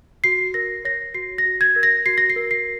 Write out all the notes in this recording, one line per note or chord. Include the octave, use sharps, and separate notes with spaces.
F#4 C7
A#4 A#6
C#5 A#6
F#4 C7
A#6
F#4
G#6
A#4
A#6
F#4 C7
A#6
C7
A#4
C7